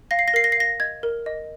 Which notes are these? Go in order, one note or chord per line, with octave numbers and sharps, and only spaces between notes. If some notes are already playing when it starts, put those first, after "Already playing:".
F5 A#6
C7
A#6
A#4 C7
A#6
C7
F5 A#6
D#5 G#6
A#4
D#5